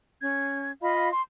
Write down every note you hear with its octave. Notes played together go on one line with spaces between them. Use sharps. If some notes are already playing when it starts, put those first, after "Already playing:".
C#4 G#6
F4 D#5 F5 B5
C6